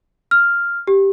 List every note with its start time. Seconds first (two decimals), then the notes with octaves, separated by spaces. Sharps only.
0.31 F6
0.87 G4